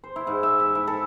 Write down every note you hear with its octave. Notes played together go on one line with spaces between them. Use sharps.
C5
E4
G#2
E5
E5
E4
A4